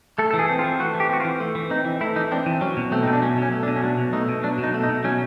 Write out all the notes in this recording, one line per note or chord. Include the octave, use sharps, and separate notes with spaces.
A3 A4
A4
E3
G#4
C4
F4
E3
A3 F#4
E3
G4
C4 F#4
F4
E3
A3
E3
C4 D#4
E3
A3 E4
E3 D#4
C4 D4
E3
F#3 C#4
B2
A3 C4
B2 D#4
D4
F#3 C#4
B2 C#4
A3
D4
B2
C#4
F#3 D4
B2
A3 D#4
B2
F#3 D4
B2 D#4
A3
D#4
B2
F#3 C#4